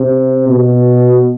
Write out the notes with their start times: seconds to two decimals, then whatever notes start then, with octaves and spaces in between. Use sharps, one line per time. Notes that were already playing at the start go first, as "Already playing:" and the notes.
Already playing: C3
0.49 B2